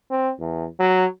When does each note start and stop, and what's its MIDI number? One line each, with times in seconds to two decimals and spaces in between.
0.10 0.31 60
0.39 0.66 40
0.80 1.06 54